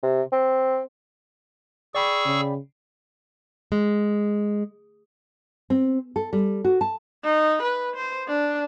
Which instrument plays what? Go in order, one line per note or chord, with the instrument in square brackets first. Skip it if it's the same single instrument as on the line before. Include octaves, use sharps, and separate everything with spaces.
[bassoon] C3
C4
[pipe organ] G#4 C#6 E6 [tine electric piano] D5 G5 B5
[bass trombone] C#3
[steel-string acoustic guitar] G#3
[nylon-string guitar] C4
A4
G3
F#4
A5
[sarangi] D#4
B4
C5
D4